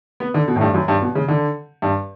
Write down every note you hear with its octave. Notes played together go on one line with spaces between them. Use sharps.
B3
D3
B2
A2
G2
F#2
G2
B2
C#3
D3
G2